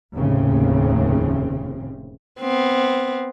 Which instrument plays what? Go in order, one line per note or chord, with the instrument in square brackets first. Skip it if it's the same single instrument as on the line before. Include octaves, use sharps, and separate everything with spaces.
[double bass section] F1 D#2 A2 C#3 C4
[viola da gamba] B3 C4